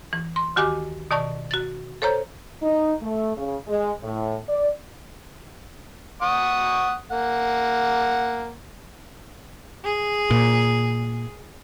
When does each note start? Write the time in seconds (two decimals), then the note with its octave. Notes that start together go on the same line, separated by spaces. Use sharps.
0.13 E3
0.36 C6
0.56 D2 D#3 F#4 G4 G#5 D6
1.11 B2 D#3 D5 A5 C#6
1.51 F#4 A6
2.02 A4 C5 C#5 A#5 G6
2.62 D#4
3.01 A3
3.37 C#3
3.68 G#3
4.03 A2
4.48 D5
6.22 F#5 C#6 D#6
7.11 A#3 F#5
9.83 G#4
10.31 A#2